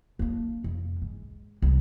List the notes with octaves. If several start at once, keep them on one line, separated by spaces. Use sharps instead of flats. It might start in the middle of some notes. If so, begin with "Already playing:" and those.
A#3 D4
F2
G#2
C2